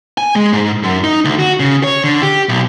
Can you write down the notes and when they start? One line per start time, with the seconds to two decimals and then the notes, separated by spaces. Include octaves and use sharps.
0.18 G#5
0.36 G#3
0.53 G#2
0.83 F#2
1.04 D#4
1.25 D2
1.39 F#4
1.60 C#3
1.84 C#5
2.04 D3
2.23 G4
2.49 B1